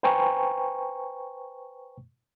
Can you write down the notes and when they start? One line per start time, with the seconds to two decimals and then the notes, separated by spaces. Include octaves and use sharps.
0.03 B4 C5 G5 G#5 A#5 C#6